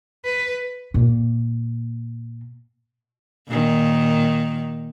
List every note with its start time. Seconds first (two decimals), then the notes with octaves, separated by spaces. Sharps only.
0.24 B4
0.94 A#2 A#3
3.48 A#2 D#3